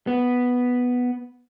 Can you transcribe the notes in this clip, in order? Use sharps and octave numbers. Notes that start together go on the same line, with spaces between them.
B3